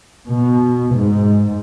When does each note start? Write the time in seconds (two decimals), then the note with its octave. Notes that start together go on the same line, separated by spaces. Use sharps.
0.25 B2
0.92 G#2